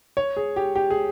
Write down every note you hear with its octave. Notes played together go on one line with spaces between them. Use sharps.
C#5
G#4
G4
G4
G#4